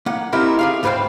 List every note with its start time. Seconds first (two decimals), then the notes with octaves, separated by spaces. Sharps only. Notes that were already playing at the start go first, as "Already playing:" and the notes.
0.06 A#3 F#5
0.33 A#3 C4 D#4 E4 G4 A#4
0.59 G4 G#4 F5
0.83 D2 G#2 B4 C5 F5 G5